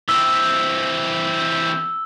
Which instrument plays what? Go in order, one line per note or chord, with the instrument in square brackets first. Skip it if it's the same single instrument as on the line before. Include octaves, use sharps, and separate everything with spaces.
[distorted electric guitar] E3 C4 [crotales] E6